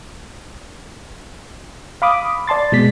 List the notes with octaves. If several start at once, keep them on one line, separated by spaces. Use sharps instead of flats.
F5 B5 D6 D#6
D5 A5 C6 A6
B2 G#3 B6